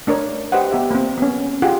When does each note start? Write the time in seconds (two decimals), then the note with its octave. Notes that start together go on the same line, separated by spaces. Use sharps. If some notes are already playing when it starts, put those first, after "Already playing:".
0.07 A3 D4 A#4 C#5
0.52 G4 B4 C5 D#5 F#5
0.71 B3 G4 E5
0.91 A#3 C4
1.18 B3 C#4
1.62 F4 G4 G#4 F#5